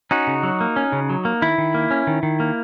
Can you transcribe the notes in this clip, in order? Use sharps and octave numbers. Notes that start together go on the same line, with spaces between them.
C#4 D#4 F#4
C#3
F#3
A#3
C#4
C#3
F#3
A#3
D#3 E4
D#3
A#3
C#4
D#3
D#3
A#3